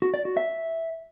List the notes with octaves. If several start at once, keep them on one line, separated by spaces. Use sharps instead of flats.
F#4
D5
F#4
E5